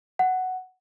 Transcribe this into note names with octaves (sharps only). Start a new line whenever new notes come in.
F#5